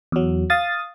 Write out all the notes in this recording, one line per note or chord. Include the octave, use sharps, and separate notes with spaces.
E2 F#3
F5 D#6 A6